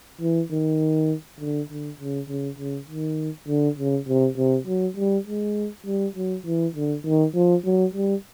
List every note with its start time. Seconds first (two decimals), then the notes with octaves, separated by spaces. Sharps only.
0.21 E3
0.51 D#3
1.40 D3
1.69 D3
2.00 C#3
2.29 C#3
2.58 C#3
2.88 D#3
3.48 D3
3.78 C#3
4.08 C3
4.37 C3
4.67 F#3
4.97 G3
5.27 G#3
5.86 G3
6.16 F#3
6.46 E3
6.75 D3
7.04 D#3
7.35 F3
7.64 F#3
7.94 G3